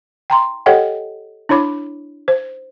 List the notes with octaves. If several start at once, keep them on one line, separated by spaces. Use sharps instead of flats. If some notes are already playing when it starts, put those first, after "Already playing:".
G5 A#5 C6
G4 A4 C#5 D#5 F#5 G5
D4 E4 C#5 B5 D6
C5